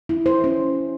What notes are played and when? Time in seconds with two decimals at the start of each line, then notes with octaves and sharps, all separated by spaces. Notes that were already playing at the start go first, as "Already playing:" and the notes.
0.09 E4
0.26 C5
0.44 C#4